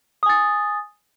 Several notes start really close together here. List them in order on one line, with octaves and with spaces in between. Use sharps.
D#6 G#5 A6